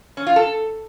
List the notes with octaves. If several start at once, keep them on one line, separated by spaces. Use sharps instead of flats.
C#4
F4
A4